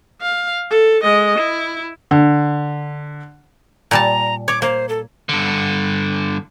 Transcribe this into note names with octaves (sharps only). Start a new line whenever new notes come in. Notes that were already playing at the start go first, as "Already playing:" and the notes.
F5
A4
G#3 D#5
E4
D3
A#2 G3 A5 A#5
C#5 D6
A#3 C5
A4
G2 D3